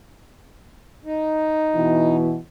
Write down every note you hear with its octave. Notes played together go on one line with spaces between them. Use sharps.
D#4
B2 E3